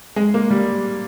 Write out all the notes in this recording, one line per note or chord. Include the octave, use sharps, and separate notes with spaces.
G#3
A#3
G3